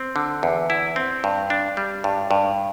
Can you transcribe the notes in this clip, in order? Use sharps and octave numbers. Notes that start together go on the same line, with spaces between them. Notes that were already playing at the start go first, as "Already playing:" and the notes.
Already playing: C4
D3
E2
E4
C4
G2
D4
G3
G2
G2